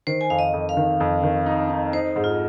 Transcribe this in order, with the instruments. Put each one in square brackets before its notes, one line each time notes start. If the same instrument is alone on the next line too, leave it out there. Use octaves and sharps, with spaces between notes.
[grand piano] D#3 [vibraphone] C5
[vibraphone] G#5
[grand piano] F2 [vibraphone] F5
[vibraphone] D#5
[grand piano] F2
[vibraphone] F5
[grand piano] D#3
F2
D#3
D#4
D#4
[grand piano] D#4 [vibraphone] C5
[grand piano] G#2
[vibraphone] F4